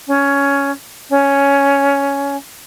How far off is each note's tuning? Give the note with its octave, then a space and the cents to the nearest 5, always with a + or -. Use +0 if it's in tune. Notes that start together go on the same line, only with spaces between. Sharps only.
C#4 +10
C#4 +10